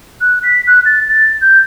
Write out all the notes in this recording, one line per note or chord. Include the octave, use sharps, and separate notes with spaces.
F#6
B6
F#6
A6
A6
G6